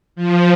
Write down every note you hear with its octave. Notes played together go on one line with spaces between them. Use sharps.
F3